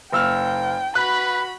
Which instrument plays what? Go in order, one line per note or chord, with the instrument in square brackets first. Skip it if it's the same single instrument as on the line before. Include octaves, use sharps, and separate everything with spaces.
[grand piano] F#1 E6 F6 [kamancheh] G5
[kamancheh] F#4 B5 [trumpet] B4 [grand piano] F#6